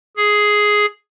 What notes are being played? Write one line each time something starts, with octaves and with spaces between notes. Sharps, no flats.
G#4